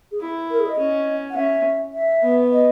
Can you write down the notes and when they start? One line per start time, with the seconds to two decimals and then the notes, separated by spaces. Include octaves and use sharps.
0.11 G#4
0.21 E4
0.50 A#4
0.59 G#4
0.68 D#5
0.78 C#4
1.30 F#5
1.36 C#4 E5
1.94 E5
2.23 B3
2.52 D#5